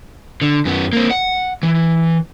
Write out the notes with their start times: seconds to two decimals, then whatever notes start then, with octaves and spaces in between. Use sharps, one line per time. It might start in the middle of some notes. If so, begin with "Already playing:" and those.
0.42 D3
0.65 F#2 B3
0.93 A#3 C4
1.11 F#5
1.63 E3